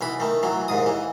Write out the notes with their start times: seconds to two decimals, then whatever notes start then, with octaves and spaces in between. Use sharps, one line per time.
0.01 B1 E3 B5
0.20 D#3 A3
0.43 E3 F#3
0.68 D#2 G#2 D#6
0.86 E3